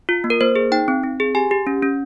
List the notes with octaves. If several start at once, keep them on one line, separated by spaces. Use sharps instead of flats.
F4
A#3
A#4
A#3 C5
G#4
D#4 G5
C4
C4
G#4
G4 G#5
G4
C#4
C#4